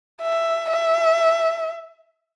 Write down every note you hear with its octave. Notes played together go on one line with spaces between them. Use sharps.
E5
E5